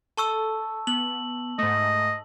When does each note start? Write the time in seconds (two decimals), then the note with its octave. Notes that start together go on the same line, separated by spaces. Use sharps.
0.17 A4 A5 C#6 E6
0.87 B3 F#7
1.59 G#2 A3 D#5